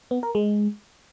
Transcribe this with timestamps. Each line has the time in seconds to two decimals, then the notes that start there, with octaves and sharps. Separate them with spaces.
0.11 B3
0.23 A#4
0.35 G#3